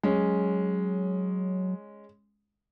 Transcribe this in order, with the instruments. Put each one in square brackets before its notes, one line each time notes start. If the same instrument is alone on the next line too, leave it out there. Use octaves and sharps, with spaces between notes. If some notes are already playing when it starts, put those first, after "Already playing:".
[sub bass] F#3 [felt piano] G#3 C#4